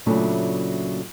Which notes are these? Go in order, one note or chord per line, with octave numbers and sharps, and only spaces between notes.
A#2 C#3 F#3 A3 D4 E4